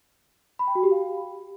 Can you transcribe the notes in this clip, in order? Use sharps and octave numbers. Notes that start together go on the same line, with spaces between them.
B5
G5
F#4
G4
F5